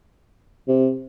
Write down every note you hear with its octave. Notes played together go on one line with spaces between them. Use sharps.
C3